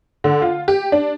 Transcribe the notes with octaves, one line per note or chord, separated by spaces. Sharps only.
D3
F4
G4
D4